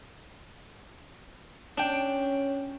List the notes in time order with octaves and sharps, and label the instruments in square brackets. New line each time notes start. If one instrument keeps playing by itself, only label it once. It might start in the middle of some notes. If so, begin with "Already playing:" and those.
[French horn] C#4 [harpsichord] D4 G5